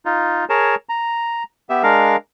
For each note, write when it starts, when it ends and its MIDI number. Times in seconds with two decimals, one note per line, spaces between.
0.05 0.45 63
0.05 0.45 65
0.49 0.75 68
0.49 0.75 70
0.49 0.75 73
0.49 0.75 81
0.89 1.43 82
1.69 1.83 59
1.69 1.83 67
1.69 1.83 76
1.83 2.16 56
1.83 2.16 62
1.83 2.16 70
1.83 2.16 77